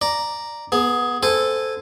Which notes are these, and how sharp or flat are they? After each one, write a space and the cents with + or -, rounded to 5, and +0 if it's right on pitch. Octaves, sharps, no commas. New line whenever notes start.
D5 +0 A#5 +0
B3 -15 G#4 +15
A4 +0 C5 -15 G#5 -15